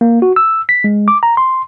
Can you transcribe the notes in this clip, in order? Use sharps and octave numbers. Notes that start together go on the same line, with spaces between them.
A#3
F#4
E6
B6
G#3
D6
A#5
C6